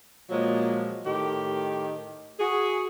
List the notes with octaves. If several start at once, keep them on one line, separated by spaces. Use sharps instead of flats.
A#2 F3 F#3 G#3
A2 D#3 G4
F#4 G#4